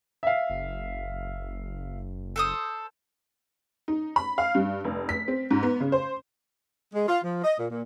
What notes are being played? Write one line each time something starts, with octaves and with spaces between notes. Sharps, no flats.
E5 F5
F#1
A4 C5 D#6
D#4
B5
F5
G2
F1
B6
C4
G#2
B3
C#3
C5
G#3
F4
F3
D#5
A#2
A#2